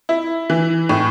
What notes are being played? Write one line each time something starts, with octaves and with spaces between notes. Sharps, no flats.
E4
E3
A2